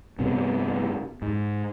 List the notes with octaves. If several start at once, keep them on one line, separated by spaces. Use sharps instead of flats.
G2 C3 B3
G#2